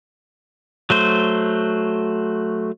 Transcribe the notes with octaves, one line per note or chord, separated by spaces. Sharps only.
F#3 A3 C5